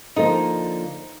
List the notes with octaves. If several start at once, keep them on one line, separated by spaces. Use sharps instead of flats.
D3 F3 A#3 D#4